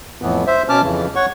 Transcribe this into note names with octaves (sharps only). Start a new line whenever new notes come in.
F2 A2 E3 B3
C5 E5
B2 C#4 A5 D6 F6
F2 C#3 E3
C#5 F#5 C#6